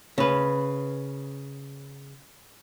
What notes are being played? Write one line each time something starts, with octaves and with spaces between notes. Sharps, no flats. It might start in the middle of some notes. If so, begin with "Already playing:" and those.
C#3 B4